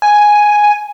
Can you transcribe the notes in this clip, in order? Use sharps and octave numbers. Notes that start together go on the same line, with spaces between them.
G#5